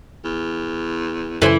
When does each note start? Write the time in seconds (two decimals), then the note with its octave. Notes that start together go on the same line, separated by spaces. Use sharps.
0.24 E2
1.42 F#2 C#3 E3 E4 A4 C5 G#5